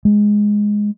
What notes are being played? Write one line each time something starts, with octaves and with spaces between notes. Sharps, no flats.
G#3